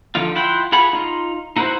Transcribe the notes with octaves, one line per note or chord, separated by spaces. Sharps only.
D3 F3 D#4 F4
E4 F4 F#5 G5
F4 G#4 F#5 B5
D#4 F4
D#4 E4 F#4 B4 C5